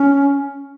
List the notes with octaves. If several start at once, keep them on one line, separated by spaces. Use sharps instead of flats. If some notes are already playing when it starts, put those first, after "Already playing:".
Already playing: C#4